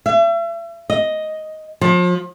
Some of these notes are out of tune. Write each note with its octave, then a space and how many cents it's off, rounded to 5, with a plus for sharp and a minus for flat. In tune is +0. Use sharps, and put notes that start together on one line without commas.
E5 +40
D#5 +5
F3 +35